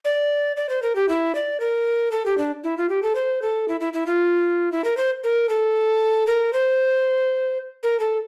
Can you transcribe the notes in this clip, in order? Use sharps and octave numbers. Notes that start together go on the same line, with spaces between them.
D5
D5
C5
A#4
G4
E4
D5
A#4
A4
G4
D4
E4
F4
G4
A4
C5
A4
E4
E4
E4
F4
E4
A#4
C5
A#4
A4
A#4
C5
A#4
A4